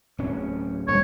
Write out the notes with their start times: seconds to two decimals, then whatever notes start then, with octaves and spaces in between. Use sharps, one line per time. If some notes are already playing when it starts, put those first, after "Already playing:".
0.18 D1 C#4
0.88 D#1 G2 G3 C#5